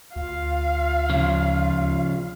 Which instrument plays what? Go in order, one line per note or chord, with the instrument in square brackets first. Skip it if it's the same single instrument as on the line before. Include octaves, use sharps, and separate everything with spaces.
[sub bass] D2 [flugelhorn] F4 [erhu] F5
[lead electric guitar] C#3 F3